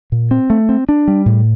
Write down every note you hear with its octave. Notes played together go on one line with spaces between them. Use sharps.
A#2
C4
A3
C4
D4
G3
A2